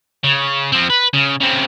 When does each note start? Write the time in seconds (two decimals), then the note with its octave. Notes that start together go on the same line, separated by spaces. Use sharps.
0.24 C#3
0.72 F3 C4
0.90 B4
1.14 C#3
1.40 C#3 C4